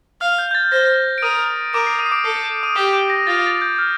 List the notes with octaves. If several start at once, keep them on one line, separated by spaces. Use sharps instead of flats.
F5 F6
G6
G6
A6
C5 A#6
D7
A#4 D#6 D#7
A#4 D6 D7
C7
D#6 D#7
C7
D6 D7
A4 C7
D#6 D#7
G4 D6 D7
D6 D7
A#6
F4 A6
A6
G6
F6